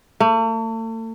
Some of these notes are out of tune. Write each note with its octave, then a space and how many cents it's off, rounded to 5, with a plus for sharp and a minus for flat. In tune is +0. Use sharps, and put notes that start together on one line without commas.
A3 +40